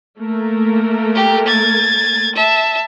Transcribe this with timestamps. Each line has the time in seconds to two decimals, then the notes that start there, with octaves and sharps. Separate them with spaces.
0.20 A3 A#3 A#4
1.15 G4
1.46 G#6 A6
2.35 E5 A5